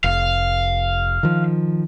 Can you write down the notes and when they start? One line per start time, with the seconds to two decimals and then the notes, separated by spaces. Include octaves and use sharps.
0.04 F1 F5
1.23 D#3 F3